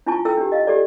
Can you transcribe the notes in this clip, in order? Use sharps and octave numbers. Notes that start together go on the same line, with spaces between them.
D4 E4 F4 G#5 A5 C#6
E4 A4 G5 E6
D4 G4
D#5 F5
G4 A4 D5